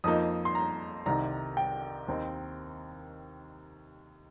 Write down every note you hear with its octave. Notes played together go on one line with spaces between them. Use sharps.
F2 F3 A#3 D#4 D#6
C6
A#5
C2 C3 D#3 A#5
G5
D#2 D#3 C4 D#4